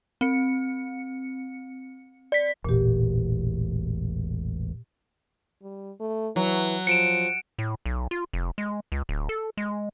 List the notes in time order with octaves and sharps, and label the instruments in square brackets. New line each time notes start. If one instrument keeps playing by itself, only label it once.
[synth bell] C4 C#7
D5 B6
[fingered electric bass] E1 A1 [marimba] A#2 G4
[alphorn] G3
A3
[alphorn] E3 [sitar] F#3
[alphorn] F3 [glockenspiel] C#7 D7 E7
[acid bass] A2
B1
F4
F1
G#3
C#2
D1
A4
G#3